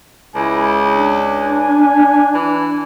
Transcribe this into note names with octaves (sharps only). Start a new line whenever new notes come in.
C#2 E4 G#5
D4
E3